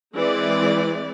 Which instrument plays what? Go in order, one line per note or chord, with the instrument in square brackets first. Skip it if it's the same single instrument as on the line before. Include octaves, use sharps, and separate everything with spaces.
[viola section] E3 G#3 C4 D5